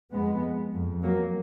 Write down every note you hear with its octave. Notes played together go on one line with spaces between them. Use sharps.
F2 G#3 B3
F2
F#3 A#3